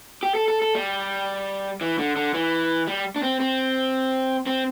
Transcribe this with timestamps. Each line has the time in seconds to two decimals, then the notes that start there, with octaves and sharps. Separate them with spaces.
0.23 G4
0.35 A4
0.48 A4
0.62 A4
0.75 G3
1.81 E3
1.99 D3
2.16 D3
2.34 E3
2.87 G3
3.16 D4
3.23 C4
3.40 C4
4.46 C4